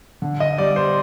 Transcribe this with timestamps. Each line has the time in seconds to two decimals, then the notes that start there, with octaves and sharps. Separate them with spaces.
0.22 D3
0.40 D#5
0.58 G3 D5
0.76 C5